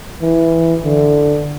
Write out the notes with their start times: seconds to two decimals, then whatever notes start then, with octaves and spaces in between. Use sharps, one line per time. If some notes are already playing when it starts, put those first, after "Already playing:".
0.21 E3
0.84 D3